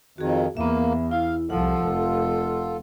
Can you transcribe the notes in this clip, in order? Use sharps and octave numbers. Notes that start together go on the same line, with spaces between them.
F2 D#3 F#4 G#4
E2 A#3 B3 E5
E4 F5
C2 F3 F4 A4 F#5
F1